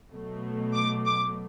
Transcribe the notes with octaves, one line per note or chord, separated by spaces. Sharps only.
B2 F#3 A3
D6
D6